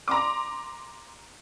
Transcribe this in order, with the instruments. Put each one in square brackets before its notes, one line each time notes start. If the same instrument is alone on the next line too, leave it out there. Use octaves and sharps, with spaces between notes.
[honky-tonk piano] A#5 C6 D6